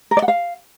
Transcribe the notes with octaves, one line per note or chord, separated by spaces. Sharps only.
A#4
D5
F#5
F5